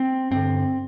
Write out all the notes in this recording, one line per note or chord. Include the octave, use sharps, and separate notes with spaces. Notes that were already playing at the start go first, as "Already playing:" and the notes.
Already playing: C4
G2 D3 C4